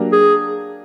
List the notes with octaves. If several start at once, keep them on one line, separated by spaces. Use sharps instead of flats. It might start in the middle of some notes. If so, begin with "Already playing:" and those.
Already playing: F#3 A#3 D4 G4 A#4
G#4